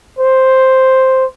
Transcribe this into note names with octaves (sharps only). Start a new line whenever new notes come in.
C5